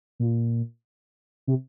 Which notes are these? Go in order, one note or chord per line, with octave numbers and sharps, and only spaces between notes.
A#2
C3